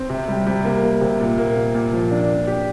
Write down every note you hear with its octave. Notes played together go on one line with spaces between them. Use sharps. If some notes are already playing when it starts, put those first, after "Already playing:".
Already playing: C4
C3
G3
C3
A#3
A#3
C3
A#2
A#3
A#2
A#2
F3
D4
A#2
G4